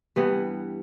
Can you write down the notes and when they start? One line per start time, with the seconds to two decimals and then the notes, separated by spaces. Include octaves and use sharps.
0.16 G2 E3 G3 B3